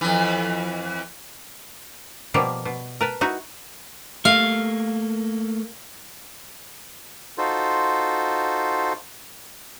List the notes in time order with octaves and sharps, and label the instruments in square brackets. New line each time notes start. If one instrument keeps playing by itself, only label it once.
[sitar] F2 E3
[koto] B2 F3 G3 A#3 A#4
B2
A#4 B4 A5
D#4 E4 F#4
[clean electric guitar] A3 A#3 [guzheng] F5
[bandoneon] D#4 F4 F#4 A4 C5